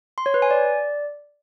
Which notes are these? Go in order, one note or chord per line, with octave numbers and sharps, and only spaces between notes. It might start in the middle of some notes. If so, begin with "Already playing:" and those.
C6
C#5
B4
G#5
D5